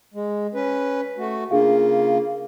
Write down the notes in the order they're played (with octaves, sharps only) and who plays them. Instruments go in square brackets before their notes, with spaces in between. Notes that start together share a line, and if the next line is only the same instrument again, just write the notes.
[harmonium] G#3
C#4 B4
A3 F#4
[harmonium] C#3 A#3 F4 [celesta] D4 G#4 F5